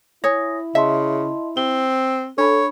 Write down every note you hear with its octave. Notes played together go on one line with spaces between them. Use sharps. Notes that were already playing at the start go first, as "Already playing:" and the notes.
E4 C#5 G#5 D#6 A#6
C#3 D#5 E5 A5 C6
C4 G7
D4 A4 C#5 B5